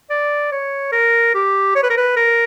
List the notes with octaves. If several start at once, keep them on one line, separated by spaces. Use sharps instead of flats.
D5
C#5
A#4
G4
C#5
B4
A#4
B4
A#4